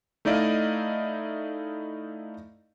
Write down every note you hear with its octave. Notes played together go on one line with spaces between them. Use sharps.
A3 D#4 E4 D5 D#5 F5